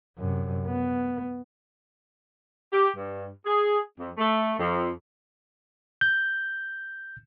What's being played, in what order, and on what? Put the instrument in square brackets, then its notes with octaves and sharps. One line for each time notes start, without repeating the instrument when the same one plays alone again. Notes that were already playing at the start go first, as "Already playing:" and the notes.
[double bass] F#2 C3
B3
[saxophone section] G4
G2
G#4
F2
A3
F2
[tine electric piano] G6